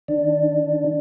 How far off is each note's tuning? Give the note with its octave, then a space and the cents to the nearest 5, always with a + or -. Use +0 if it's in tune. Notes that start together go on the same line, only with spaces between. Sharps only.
D#3 +0 D4 +5